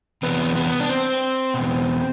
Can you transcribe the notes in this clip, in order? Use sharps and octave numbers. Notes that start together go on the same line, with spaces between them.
E2 C3 E3 B3
B3
D4
C4
E2 B2